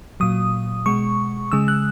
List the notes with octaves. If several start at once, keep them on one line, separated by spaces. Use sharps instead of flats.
A#2 F#3 D#6
B2 G#3 C#6
C#3 G#3 E6
F#6